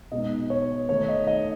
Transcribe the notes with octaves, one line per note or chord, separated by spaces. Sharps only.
B2 G#3 B3 D#4 D#5
C#5
D#3 A3 D#4 C#5
D#5
D#5